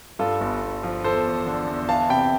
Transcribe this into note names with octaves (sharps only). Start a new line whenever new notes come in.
G2 F4 A4
G1
G1
F3
E2 A4 C5
E2
D3
E2
E3 F5 A5
C3 G5 B5